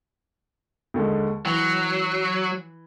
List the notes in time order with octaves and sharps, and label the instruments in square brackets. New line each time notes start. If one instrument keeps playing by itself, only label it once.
[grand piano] D#2 D3 G#3
[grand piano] E3 [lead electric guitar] F#3